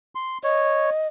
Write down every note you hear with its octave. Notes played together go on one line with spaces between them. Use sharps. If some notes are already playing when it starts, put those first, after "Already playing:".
C6
C#5 D#5